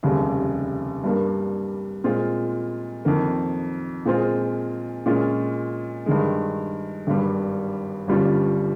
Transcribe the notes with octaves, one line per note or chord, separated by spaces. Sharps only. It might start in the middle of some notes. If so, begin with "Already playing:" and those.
F1 D#2 C#3 G3
G2 G3 A#3
A#2 G#3 C4 F4
F2 D#3 A#3
A#2 G#3 C4 F4 G#4
A#2 G#3 C#4 F4
G2 D#3 G#3
G#1 G2 G3
G1 G2 G3 C#4 F4